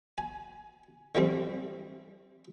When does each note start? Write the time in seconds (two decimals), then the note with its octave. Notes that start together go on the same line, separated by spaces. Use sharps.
0.18 G#5
1.15 D3 E3 G3 C4